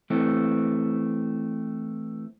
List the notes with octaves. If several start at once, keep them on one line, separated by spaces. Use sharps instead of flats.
E3 A3 C4